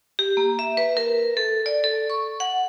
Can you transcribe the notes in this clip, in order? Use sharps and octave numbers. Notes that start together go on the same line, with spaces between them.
G4
A#3
E5
B4
A#4
A4
D5
A4
C#6
F#5